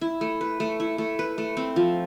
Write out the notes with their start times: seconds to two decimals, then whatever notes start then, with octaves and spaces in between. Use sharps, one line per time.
0.01 E4
0.21 A3
0.41 B4
0.60 A3
0.80 E4
0.98 A3
1.19 B4
1.38 A3
1.57 C4
1.76 F3